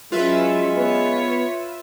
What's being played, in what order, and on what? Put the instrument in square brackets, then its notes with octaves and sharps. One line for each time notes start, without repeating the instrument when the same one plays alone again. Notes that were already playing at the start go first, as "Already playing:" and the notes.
[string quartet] F#3 C#4 [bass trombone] G#3 [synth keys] F4 B4 E5
[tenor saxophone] B3 [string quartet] C#5